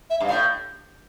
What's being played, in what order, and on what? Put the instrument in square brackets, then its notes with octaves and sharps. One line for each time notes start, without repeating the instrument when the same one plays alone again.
[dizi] E5
[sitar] G2
[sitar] A2 [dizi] F5